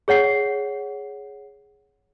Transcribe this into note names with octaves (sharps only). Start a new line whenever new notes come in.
G#4 C#5 F#5 C7